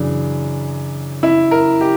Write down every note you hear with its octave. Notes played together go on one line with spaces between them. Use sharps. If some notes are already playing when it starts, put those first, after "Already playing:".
Already playing: F#2 C#3 E3 D4
E4
A#4
G4